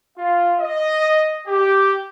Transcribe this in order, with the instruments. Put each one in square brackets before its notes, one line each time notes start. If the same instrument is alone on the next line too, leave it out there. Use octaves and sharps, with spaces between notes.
[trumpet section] F4
D#5
G4